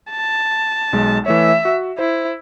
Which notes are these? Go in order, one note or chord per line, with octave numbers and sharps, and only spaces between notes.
A5
B1 G#3
E3 A3 C#5 E5
F#4
E4 C5